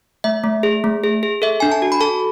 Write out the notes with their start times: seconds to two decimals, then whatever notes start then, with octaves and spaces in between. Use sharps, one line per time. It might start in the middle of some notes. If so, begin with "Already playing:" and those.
0.24 A3 E5
0.44 A3
0.63 G#4
0.84 A3
1.04 G#4
1.23 G#4
1.42 A4 E5
1.60 D4 G#5
1.72 A5
1.82 F#4
1.92 B5
2.01 A4 A5